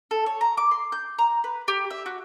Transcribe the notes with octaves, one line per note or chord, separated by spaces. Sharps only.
A4
C#5
A#5
D6
C6
G6
A#5
B4
G4
E5
F#4